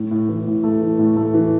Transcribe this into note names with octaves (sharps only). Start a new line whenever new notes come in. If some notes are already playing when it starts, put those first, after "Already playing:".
Already playing: A2
A2
E3
A2
A3
E3
A2
A3
E3